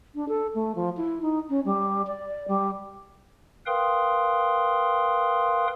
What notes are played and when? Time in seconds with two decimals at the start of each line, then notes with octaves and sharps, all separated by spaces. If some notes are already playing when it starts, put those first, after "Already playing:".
0.15 D4
0.29 A4
0.54 A3
0.75 F3
0.97 E4
1.22 D#4
1.49 C#4
1.65 G3
2.07 D5
2.48 G3
3.66 A#4 B4 F5 G5 C6 D#6